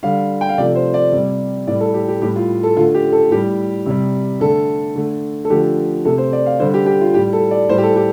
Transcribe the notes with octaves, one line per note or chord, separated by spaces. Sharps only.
D3 G3 F5
G5
F5
C3 F3 A3 D5
C5
D5
C3 G3
A2 G3 D5
A4
G4
G4
A2 G3 G4
F4
A4
D3 A3 F4
G4
A4
A2 G3 G4
C3 G3
D3 A3 A4
D3 A3
A4
D3 F3 A3 G4
C3 A3 A4
C5
D5
F5
D3 G3 C5
G4
G4
F4
A2 G3 G4
A4
D5
A2 G3 C5
G4
A4
G4